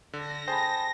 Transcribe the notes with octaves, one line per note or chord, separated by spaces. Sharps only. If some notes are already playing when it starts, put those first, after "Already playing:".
D3 A#6
G#4 C5 G5 A5 B5 A6